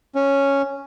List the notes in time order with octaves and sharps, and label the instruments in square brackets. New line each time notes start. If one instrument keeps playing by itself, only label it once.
[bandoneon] C#4